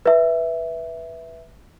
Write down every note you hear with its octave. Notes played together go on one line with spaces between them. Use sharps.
B4 E5